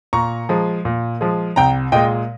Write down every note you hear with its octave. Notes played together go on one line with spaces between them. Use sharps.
A#2 A#5 C#6
F3 G#3
A#2
F3 G#3
C2 G5 A#5
A#2 G#3 D#5 G5